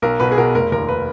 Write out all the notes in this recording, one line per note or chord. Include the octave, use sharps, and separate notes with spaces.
B1 A#4
B2 B4
G#4
B2 A#4
F1 A#4
D#2 A#4
B4